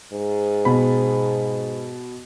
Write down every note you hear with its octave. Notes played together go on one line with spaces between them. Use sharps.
G#2
B2 B5